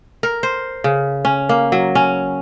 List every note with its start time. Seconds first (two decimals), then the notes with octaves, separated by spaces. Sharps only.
0.23 A#4
0.43 C5
0.84 C#3
1.25 C#4
1.49 A#3
1.72 F#3
1.95 C#4